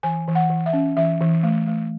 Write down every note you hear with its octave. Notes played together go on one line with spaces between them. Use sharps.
E3 G#5
E3
F#5
E3
E5
C#4
E3 E5
E3
A3
A3